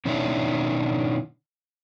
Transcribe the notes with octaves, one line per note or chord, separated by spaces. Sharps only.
B2 D#3 C#4 D4 E4